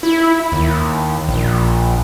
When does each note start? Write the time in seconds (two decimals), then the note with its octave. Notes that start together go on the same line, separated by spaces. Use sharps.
0.03 E4
0.52 D#2
1.29 A#1